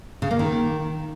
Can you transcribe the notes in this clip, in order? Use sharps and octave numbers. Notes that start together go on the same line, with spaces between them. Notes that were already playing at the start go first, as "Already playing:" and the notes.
C#3
A#3
D#3